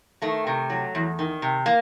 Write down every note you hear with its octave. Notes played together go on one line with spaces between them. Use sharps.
D#3 A3
C3
F#3
E2
D#3
C3
A#3